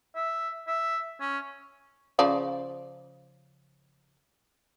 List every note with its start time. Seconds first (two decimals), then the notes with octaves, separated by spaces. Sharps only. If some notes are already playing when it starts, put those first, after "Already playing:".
0.15 E5
0.67 E5
1.20 C#4
2.19 C#3 F3 D5